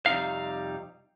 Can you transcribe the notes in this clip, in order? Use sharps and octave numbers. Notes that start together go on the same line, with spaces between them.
F2 C3 G3 D#4 F5